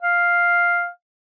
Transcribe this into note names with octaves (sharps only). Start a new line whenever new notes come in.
F5